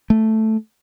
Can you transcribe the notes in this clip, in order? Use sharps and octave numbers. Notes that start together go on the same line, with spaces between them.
A3